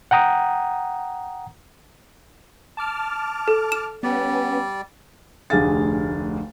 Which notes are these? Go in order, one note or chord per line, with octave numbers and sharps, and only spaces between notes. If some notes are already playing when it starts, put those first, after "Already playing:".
F#5 G5 A#5 D#6
A5 D6 F6
A4
E7
G3 B3 C#4 D5
F1 D2 G4 G#4 F5 A6